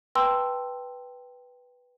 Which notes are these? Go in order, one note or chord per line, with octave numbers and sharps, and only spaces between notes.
B4 G5 A5 C6 E6